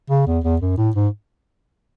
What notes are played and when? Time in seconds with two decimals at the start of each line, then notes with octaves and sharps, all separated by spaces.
0.10 C#3
0.27 E2
0.44 E2
0.61 F#2
0.77 A2
0.95 G#2